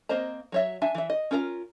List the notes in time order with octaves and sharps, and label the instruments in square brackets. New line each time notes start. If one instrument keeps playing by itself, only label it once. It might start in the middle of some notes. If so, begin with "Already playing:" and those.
[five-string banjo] A#3 C4 C5 D#5 A#5
F#3 C#5 E5
D4 E5 G#5
E3 E5
D#5
C#4 F4 A#4 D5 A#5